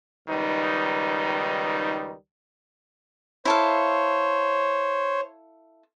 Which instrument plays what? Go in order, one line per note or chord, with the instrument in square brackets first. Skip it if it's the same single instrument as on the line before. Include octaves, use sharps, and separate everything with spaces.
[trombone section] C#2 D#3 G3 D#4 B4
[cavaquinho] E4 A4 F5 [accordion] C5 C#5